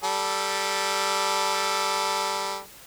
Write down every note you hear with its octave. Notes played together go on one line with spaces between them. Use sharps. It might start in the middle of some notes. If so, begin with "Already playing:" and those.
G3 A4